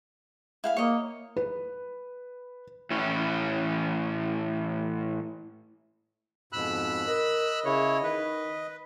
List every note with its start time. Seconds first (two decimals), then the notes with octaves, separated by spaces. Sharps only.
0.64 E4 F5 G#5
0.77 A#3 C#5 D#5
1.37 B4
2.90 A2 E3 C#4
6.53 F2 G#2 B2 B5 E6 F#6
7.07 A#4 D#5
7.65 C#3 E4 C#5
8.03 D#3 B4